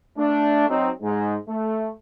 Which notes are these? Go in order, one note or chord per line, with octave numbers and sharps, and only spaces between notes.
A3 D4
F#3 C4 D#4
G#2 G#3
A3